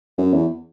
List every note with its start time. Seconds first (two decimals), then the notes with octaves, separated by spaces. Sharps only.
0.18 F#2
0.34 E2